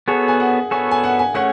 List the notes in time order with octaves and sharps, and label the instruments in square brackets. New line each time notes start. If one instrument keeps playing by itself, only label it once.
[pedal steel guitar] B3 F#4 A4 C#5 [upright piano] G#4
[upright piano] G#5
F#5
[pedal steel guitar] B3 F#4 A4 C#5 [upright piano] G#5
[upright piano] G#5
F#5
G#5
[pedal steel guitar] A3 C#4 G#4 C#5 [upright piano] F#5